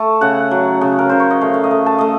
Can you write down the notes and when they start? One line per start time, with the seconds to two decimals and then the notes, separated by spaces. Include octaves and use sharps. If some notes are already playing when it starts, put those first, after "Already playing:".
Already playing: A3 A5
0.21 C#3 F#5
0.51 F#3
0.81 C#3
0.99 A#4
1.09 C#3 C5
1.20 C#5
1.30 D#5
1.41 A3 F5
1.54 F5
1.64 D#5
1.71 A3
1.86 A5
1.98 A3 D#5